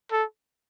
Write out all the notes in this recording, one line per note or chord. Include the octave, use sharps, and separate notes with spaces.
A4